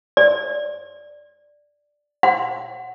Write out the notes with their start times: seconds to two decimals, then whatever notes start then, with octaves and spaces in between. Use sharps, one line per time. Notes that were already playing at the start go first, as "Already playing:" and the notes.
0.17 D5
2.23 F#5